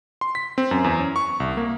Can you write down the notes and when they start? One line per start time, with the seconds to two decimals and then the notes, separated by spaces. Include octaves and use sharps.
0.21 C6
0.35 B6
0.58 C4
0.71 F#2
0.84 E2
1.00 C#4
1.16 C#6
1.40 C2
1.57 A#3